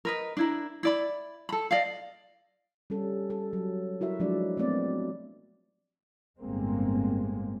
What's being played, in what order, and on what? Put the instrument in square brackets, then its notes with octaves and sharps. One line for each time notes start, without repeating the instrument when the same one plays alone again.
[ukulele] A#4 B4 D#5
D4 E4 A#4
E4 D5 B5
A4 B5
D5 D#5 F5
[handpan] G3 C#4 A4
A4
F#3
E4 F#4 A#4 E5
F3 F#3 G#3 D4 D5
A3 B3 C4 D5
[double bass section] G1 A2 G#3 A#3 C4